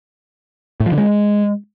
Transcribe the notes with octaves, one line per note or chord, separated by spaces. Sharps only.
A2
F3
D3
G#3